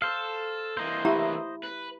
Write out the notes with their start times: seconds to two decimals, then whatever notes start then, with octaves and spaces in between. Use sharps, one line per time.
0.02 A4 C5 F5
0.77 E3 A#3 C5 D#5
1.05 E4 G4 A#5
1.63 B4